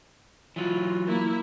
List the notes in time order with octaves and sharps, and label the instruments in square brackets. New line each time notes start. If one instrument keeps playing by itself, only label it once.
[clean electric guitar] E3 F#3 [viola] F4
[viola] A#3 E4